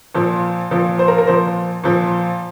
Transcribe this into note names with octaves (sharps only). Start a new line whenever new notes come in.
A#2 F3
A#2 F3
C5
A#4
A#4
A#2 F3 C5
A#2 F3